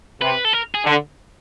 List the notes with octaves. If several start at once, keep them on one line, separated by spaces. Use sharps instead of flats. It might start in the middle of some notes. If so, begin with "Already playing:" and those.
C3 B4
A4
A#4
G#4
D3